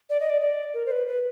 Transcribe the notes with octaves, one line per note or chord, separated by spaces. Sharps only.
D5
D#5
D5
D5
A#4
C5
B4
B4